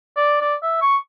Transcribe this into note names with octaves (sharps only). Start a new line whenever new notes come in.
D5
D5
E5
C#6